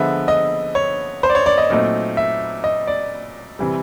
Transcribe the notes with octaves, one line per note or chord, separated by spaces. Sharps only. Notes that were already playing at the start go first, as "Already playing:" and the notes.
Already playing: D3 F3 G#3 B3 E5
D#5
C#5
C5
D5
C#5
D5
D#5
A#2 F#3 A3 C4 D#4
E5
D#5
D5
C3 E3 G3